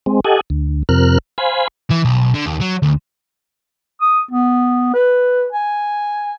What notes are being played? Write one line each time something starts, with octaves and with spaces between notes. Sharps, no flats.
G#3 C4
G4 A4 D#5 F#5 G#5
D2
F2 C3 A#4 F6 F#6
C5 F5 G#5 B5
E3
B1
D3
D#2
F#3
D2
D#6
B3
B4
G#5